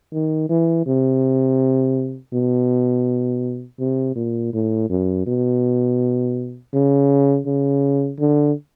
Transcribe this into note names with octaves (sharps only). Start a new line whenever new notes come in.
D#3
E3
C3
B2
C3
A#2
A2
F#2
B2
C#3
C#3
D3